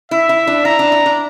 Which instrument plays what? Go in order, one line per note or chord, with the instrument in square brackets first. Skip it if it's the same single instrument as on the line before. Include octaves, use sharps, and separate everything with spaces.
[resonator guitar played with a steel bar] E4 [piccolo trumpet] E5
[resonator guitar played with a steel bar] E4
D4
[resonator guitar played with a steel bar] E4 [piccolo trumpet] A#5
[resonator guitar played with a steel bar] D4
E4
D4